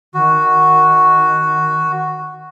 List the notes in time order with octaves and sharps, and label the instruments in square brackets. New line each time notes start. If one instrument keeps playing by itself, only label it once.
[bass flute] D#3 [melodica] F#4